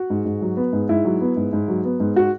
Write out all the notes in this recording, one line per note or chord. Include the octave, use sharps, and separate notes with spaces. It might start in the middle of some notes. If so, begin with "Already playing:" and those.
Already playing: F#4
G#2
G#2
F#3
B3
G#2
G#2 E4
F#3
B3
G#2
G#2
F#3
B3
G#2
F#4